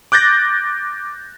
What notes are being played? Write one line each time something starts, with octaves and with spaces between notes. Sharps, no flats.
D6 F#6 G6 A6 A#6